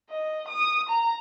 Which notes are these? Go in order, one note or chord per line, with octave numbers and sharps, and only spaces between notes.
D#5
D#6
A#5